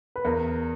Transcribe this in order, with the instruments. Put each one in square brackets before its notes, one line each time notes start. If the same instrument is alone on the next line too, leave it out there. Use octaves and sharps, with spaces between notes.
[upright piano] B4
[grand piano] E2 [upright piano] A#4